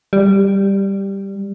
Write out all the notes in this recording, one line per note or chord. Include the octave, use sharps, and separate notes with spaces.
G3